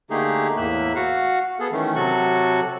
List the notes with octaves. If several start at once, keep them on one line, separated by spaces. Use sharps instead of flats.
D3 A3 A#3 D#4 G4 G#4
E2 A2 A#3 E5 F#6
F#4 F5 F#5
B3 G#4 A4
D#3 E3 A3 C#4
C3 F#3 F#4 A4 C#6 F#6